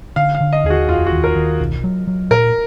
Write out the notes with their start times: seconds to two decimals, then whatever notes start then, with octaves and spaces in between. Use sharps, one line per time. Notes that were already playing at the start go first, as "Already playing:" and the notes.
0.16 D3 F5
0.35 F5
0.41 D3
0.53 D#5
0.64 D#2 G#4
0.70 F#4
0.88 F1 F4
1.07 F#4
1.12 D#2
1.24 A#4
1.36 D#2
1.60 B1
1.84 F#3
2.07 F#3
2.31 A#2 A#4